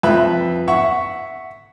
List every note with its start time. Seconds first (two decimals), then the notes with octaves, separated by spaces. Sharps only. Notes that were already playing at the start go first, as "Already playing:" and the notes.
0.03 F2 B4 E5 B5
0.68 E5 F#5 C#6